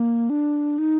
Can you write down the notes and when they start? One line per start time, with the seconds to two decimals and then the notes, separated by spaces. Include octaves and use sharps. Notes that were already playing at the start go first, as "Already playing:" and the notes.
Already playing: A#3
0.30 D4
0.78 D#4